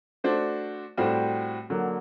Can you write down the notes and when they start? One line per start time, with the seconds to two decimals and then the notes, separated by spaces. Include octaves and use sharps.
0.24 A3 D4 F#4 C5
0.97 A2 G3 C4 F#4
1.70 D3 F#3 A#3